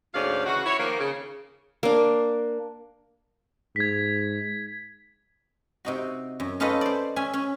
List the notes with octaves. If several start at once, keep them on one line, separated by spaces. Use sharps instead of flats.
D2 G#2 C#4 D5 F5
C#3 E3 F#4
E4 C#5
D#3 F3 A#3
C#3
A#3 D4
G#2 G#6 B6
C3 D#4 F#4
F#2
C#4 D#4 F4 A4 B4 D#5
C5 D5
C#4 E5 G#5
C#4